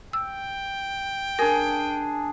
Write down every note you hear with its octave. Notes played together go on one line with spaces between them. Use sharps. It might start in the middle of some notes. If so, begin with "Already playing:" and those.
G5 E6
D4 G#4 A#4